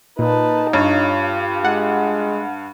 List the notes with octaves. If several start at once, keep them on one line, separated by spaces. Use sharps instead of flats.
A#2 D#4 B4 A5
G2 F4 G4 C#5
G#3 F#5